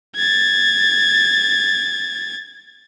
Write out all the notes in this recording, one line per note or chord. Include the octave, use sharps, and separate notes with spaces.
G#6 A6